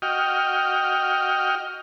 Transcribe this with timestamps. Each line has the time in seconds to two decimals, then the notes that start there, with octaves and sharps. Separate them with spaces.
0.02 F#4 D#5 G5 F6